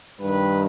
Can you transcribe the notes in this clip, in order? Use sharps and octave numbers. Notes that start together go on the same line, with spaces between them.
G2 D#3 B4